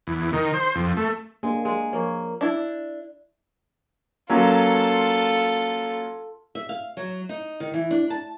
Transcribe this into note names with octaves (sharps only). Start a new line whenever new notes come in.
E2
D#3
C5
F2
A3
G#3 A#3 D4 A#4
G#3
F3 A#3 C#5
D4 E4
F#3 A#3 C#4 F4 A4
E5
F5
F#3
D#4
D#3
E3
D4
A5